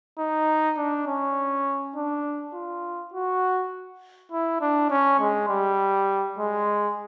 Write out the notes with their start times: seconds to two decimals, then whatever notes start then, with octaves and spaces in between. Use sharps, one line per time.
0.19 D#4
0.77 D4
1.07 C#4
1.96 D4
2.54 F4
3.14 F#4
4.32 E4
4.61 D4
4.90 C#4
5.20 G#3
5.49 G3
6.38 G#3